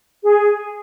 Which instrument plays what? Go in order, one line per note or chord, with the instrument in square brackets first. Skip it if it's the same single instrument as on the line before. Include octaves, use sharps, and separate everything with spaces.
[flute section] G#4